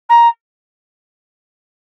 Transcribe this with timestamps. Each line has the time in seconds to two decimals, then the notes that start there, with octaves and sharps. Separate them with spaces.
0.09 A#5